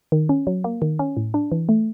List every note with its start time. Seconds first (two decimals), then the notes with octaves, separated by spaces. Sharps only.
0.12 D#3
0.29 C#4
0.47 F#3
0.64 A#3
0.82 D#3
0.99 C#4
1.17 A2
1.34 D4
1.52 E3
1.69 A3